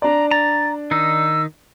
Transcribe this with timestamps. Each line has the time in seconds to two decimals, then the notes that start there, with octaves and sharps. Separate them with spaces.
0.02 D4 D5 A#5
0.31 A#5 A6
0.91 D#3 D#4 E6